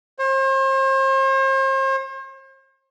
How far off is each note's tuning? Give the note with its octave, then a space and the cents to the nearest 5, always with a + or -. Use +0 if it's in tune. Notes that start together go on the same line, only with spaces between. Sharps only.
C5 +40